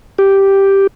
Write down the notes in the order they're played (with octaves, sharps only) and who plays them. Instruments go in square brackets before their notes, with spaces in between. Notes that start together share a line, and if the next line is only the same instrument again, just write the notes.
[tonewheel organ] G4